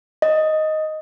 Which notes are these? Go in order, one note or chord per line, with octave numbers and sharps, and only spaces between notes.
D#5